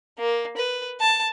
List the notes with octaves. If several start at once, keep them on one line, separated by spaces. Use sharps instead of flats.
A#3
B4
A5